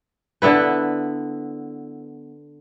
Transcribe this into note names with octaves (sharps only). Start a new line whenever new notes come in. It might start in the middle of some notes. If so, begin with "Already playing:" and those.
D3 B3 E4 B4